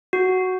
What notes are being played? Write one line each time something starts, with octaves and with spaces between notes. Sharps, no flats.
F#4